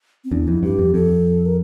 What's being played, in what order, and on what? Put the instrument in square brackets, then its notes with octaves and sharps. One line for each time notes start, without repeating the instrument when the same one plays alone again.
[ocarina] C4
[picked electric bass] E2 [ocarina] D4
[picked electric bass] F2 [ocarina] E4
[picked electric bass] G2 [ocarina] G4
[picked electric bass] F2
[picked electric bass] F2 [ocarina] A4
[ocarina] A#4